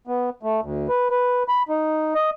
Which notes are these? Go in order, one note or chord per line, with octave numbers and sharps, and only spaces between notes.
B3
A3
D2
B4
B4
B5
D#4
D#5